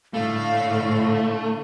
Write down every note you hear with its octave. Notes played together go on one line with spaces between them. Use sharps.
A2 D3 A3 F5